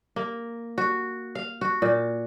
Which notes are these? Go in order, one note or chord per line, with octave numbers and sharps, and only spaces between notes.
A#3
F#4
F5
F#4
A#2